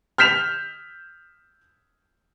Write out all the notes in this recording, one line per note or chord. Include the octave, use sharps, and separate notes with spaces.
F6 G6 B6 E7 F7